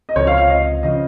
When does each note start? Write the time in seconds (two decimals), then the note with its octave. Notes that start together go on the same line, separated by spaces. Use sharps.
0.09 D#5
0.16 C#2 C3 F3 C#5
0.27 F5
0.38 F5
0.49 D#5
0.83 C#3 F3 D#5